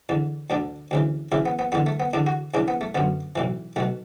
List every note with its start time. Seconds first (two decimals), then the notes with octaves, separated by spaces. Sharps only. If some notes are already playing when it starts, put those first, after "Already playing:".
0.09 E2 D3
0.50 D2 D3 D4
0.91 D2 C#3 E3
1.32 C#2 C#3 E3 E4
1.46 B3
1.59 B3
1.72 E2 D3 B3
1.86 A3
2.00 B3
2.14 E2 D3 D4
2.27 F#4
2.54 E2 C#3 E3 D4
2.68 B3
2.81 A3
2.95 F#2 D3 B3
3.36 B1 A2 E3
3.76 B1 A3
3.80 B2